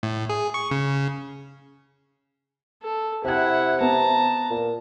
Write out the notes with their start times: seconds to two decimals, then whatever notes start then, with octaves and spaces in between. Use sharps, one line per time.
0.03 A2
0.29 G#4
0.54 C#6
0.71 C#3
2.83 A4
3.25 C3 E4 F#5 G5 G#6
3.81 B3 A5 A#5
4.50 A#2